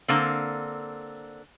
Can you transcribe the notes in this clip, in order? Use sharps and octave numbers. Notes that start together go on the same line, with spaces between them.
D3 A#3 C4